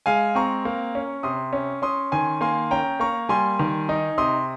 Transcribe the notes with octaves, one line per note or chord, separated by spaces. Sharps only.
G#3 F5 G#5
C4 A#5 C#6
A#3
C#4
C3 C6 D#6
C#4
C#4 C6 D#6
D#3 G#5 C6
A#3 G#5 C6
C#4 G5 A#5
A#3 A#5 C#6
G3 G#5 C6
D#3
D#4
C3 C6 D#6